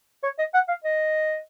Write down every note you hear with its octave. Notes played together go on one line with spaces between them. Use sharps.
C#5
D#5
F#5
F5
D#5